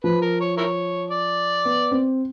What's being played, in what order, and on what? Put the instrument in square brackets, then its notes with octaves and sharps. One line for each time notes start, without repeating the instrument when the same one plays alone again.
[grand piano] F3 [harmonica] B4
[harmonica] A#4
C#5
E4 A#4 C#5
D5
[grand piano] B3
C4